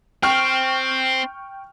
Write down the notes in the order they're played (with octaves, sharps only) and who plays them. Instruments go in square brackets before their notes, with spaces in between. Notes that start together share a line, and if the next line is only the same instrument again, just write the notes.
[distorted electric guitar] C4 [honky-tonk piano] G5 C#6 F6